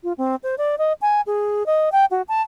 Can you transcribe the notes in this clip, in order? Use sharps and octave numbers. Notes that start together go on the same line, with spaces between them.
F4
C4
C5
D5
D#5
G#5
G#4
D#5
G5
F#4
A5